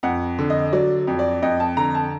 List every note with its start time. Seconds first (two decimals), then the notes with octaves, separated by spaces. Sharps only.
0.03 F2 F#5
0.38 D3
0.50 D#5
0.73 F#3 D5
1.07 F2
1.19 D5
1.42 F2 D#5
1.60 A5
1.77 D3 A#5
1.95 A5